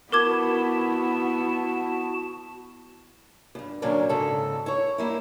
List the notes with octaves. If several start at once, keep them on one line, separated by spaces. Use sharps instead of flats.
B3 E4 F#4 A#4 A5 D6 G#6
E2 G2
A#2 D3 F#3 A#3 C#4 D4
G#2 C#3 A4
E4 C#5
G3 A#3 E4